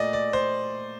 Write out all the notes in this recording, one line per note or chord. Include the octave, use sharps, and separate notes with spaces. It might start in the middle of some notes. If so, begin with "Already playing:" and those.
Already playing: A#2 A3 D5 D#5
D5
C5